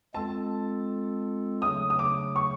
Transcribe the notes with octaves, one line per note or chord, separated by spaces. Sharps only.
G#3 C4 F4 A4 A5
C#3 F#3 A3 D4 D#6
D#6
D6
C#6